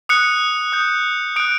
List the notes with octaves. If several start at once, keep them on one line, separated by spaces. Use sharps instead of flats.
D#6 F#6 C#7
D#6 G6
D#6 F#6 D7